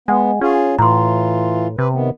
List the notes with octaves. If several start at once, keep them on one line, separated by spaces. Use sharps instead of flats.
G#3 B3 F#5 G#5
C#4 F4 G#4
A2 E3 F4 A#5 C6
C3 B4
D#3 B3